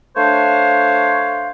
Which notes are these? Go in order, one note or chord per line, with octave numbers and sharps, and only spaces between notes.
A3 D4 C5 C#5 F5